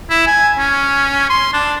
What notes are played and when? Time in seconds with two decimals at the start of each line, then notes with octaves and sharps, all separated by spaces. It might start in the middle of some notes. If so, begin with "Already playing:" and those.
0.10 E4
0.26 G#5
0.58 C#4
1.30 C6
1.53 D4